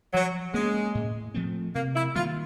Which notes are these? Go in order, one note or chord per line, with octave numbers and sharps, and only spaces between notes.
F3 F#3
G#3 A#3 C#4
A2
F3 A3 C4
C3 A#3
E4
D#3 G3 A#3 F4